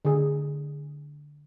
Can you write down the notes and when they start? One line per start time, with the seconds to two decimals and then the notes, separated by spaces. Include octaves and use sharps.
0.05 D3 G#4